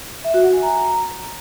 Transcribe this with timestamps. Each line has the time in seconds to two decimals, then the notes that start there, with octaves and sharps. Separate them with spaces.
0.25 E5
0.34 F#4
0.44 F#5
0.53 G#5
0.63 A#5